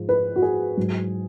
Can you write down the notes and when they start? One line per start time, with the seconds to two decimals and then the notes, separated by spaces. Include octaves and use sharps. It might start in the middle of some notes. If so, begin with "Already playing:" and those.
Already playing: G#2 F3
0.09 B4
0.36 F#4
0.42 G#4
0.77 G#2 F#3